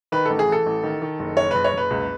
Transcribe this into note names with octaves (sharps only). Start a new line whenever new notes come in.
D#3 B4
A1 A4
G#4
E3 A4
A1
D#3
D#3
F#1
F#1 C#5
F#1 B4
C#5
F#1 B4
C#2